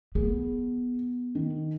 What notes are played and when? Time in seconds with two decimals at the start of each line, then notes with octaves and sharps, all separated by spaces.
0.15 B3 G#4
1.35 D#3